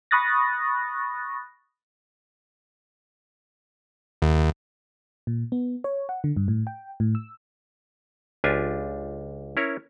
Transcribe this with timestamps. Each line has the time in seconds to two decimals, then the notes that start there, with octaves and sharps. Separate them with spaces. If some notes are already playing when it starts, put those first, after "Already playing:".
0.11 B5 C#6 D#6 F#6 A6 A#6
4.22 D#2
5.27 A#2
5.52 B3
5.84 C#5
6.09 F#5
6.24 D3
6.36 G2
6.48 A2
6.67 G5
7.00 A2
7.15 E6
8.44 C#2 D4 F4 G4 G#5
9.57 C#4 E4 A#4 C#5